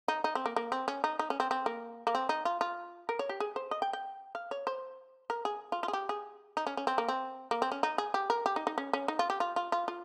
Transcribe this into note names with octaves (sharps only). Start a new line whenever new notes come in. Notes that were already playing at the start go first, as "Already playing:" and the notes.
D#4
D#4
C4
A#3
A#3
C4
C#4
D#4
D#4
C#4
C4
C4
A#3
A#3
C4
D#4
F4
F4
A#4
C#5
G4
G#4
C5
D#5
G5
G5
F5
C#5
C5
A#4
G#4
F4
F4
G#4
G4
G#4
D#4
C#4
C#4
C4
A#3
C4
A#3
C4
C#4
D#4
G#4
G4
A#4
G4
D#4
D#4
C#4
C#4
D#4
F4
G4
F4
F4
F4
F4